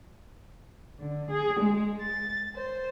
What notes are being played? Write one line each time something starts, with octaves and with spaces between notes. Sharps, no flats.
D3
G#4
G#3
A6
C5